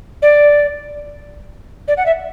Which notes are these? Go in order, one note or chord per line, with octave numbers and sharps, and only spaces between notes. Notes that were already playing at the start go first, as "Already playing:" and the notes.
D5
D5
F#5
E5